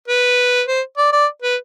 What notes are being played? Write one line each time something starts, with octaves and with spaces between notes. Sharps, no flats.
B4
C5
D5
D5
B4